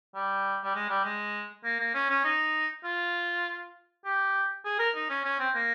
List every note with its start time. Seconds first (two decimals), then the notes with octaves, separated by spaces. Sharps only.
0.15 G3
0.63 G3
0.75 G#3
0.90 G3
1.05 G#3
1.65 A#3
1.80 A#3
1.95 C#4
2.09 C#4
2.25 D#4
2.84 F4
4.05 G4
4.65 G#4
4.80 A#4
4.95 D#4
5.10 C#4
5.25 C#4
5.39 C4
5.55 A#3